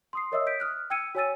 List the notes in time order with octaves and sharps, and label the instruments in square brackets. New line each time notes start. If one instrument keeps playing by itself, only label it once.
[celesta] C6 D#6 C7
A#4 C#5 D#5 E5 D#6 E6
G6 B6 D7
D#6 F6 F#6
G5 E6 G#6 C#7 D#7
F#4 C#5 G#5 E6 A6 D#7